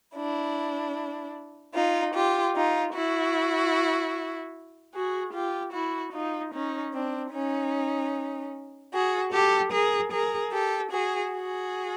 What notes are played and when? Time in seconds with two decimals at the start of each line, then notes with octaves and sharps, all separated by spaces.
0.14 D4 E4
1.74 D#4 F4
2.14 F4 G4
2.54 D#4 F4
2.93 E4 F#4
4.94 F#4 G#4
5.33 F4 G4
5.72 E4 F#4
6.12 D#4 F4
6.52 C#4 D#4
6.93 C4 D4
7.32 C#4 D#4
8.92 F#4 G#4
9.31 G4 A4
9.71 G#4 A#4
10.11 G#4 A#4
10.51 G4 A4
10.90 F#4 G#4
11.31 F#4 G#4